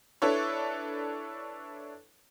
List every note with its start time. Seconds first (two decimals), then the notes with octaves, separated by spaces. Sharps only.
0.22 D4 E4 A4 B4 C#5